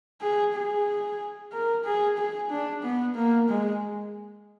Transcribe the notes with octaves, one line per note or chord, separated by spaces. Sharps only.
G#4
G#4
A#4
G#4
G#4
D4
B3
A#3
G#3